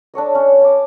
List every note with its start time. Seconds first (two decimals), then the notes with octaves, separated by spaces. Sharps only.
0.14 D4 A4 C#5 D#5
0.35 C#4
0.62 G#5 D6